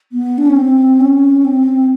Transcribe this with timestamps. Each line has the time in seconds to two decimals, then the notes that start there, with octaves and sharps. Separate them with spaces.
0.12 B3
0.38 D4
0.47 C#4
0.56 C4
1.00 C#4
1.45 C4